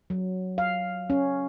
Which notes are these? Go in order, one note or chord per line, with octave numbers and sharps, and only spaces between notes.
F#3
F5
C#4